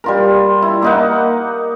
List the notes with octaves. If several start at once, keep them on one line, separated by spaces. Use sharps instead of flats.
G3 F4 A#4
E4
A#3 D#4 F#5